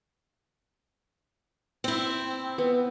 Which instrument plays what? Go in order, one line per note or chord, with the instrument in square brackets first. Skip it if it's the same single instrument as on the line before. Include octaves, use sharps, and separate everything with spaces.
[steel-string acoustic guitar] C4 E4
[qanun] B3